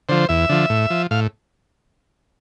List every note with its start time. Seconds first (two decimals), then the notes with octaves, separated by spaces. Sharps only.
0.09 D3 F3 C5
0.29 E2 E5
0.49 D3 F3
0.70 A2
0.90 F3
1.11 A2 F5